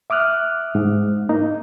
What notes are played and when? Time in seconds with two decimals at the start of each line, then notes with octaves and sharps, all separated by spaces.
0.10 E5 D6 D#6 F6 F#6
0.75 G#2
1.29 A#3 D#4